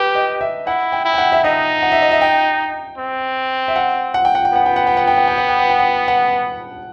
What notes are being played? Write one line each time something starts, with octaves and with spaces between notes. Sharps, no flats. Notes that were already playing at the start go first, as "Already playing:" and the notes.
Already playing: G4 B4
D#5
E5
E4 F#5
G5
E4
G5
F#5
E5
D#4 D#5
F#5
E5
D#5
E5
G5
C4
E5
F#5
F#5
G5
F#5
G5
B3 F#5
G5
F#5
G5
F#5
G5
F#5
G5
F#5
G5
F#5
G5
F#5
F#5